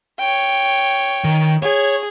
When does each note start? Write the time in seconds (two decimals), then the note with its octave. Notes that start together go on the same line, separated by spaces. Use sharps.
0.19 C#5 G5
1.24 D#3
1.62 G#4 C#5